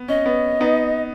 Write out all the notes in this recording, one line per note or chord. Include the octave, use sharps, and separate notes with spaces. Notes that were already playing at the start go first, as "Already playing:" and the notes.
Already playing: B3
C#4 D#5
B3
B3 D#4